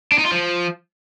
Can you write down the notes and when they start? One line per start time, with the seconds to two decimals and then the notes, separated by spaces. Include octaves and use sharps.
0.12 D4
0.18 D#4
0.25 F4
0.32 F3